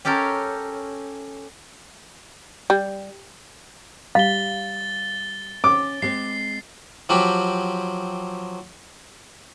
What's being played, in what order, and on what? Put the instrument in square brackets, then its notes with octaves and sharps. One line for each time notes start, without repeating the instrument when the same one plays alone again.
[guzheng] C#4 G4 A4 A#4 C#5
[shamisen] G3
[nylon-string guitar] G3 [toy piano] F5 [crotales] A6 G7
[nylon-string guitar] C#4 [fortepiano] D6
[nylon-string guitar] G#3 C4 [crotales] C7
[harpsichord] F3 F#3 C4 G4